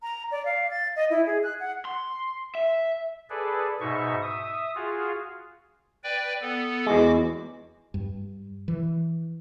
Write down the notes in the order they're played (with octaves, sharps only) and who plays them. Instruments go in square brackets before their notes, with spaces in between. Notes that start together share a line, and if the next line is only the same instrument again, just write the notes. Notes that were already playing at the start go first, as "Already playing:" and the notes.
[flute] A#5
D5
F5
A6
D#5
E4
G#4
F#6
F#5
[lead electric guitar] C6
E5
[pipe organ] G#4 A4 B4 D5
G#2 B2 D#4 E5 C#6
E5 D#6
F4 F#4 G#4 F5
B4 D5 G5
B3 A4
[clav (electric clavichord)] E2 G#3 [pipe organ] F#4 D6
[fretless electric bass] G2
E3